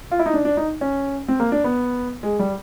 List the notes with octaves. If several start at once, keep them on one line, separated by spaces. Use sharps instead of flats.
F4
E4
D#4
D4
D4
D#4
C#4
C4
A#3
D4
B3
G#3
G3